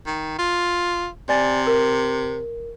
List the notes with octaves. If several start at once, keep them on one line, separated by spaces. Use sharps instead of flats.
D#3
F4
C3 D5 G#5 A6
A#4